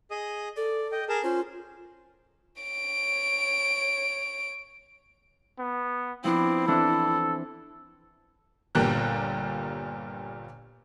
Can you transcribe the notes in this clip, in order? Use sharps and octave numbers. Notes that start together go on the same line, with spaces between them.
G#4 D#5 D#6
A4 D5
D#5 G5
G#4 A#4 A5
C#4 F4 C5
C#5 D7
B3
F3 B3 C4 D4 E4
E3 C4 D4 A4
G1 A#2 B3 G4 A#4 F#6